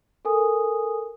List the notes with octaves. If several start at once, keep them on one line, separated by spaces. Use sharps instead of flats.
A4 A#4 G#5 D#6